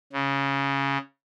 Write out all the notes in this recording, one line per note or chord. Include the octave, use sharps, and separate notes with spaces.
C#3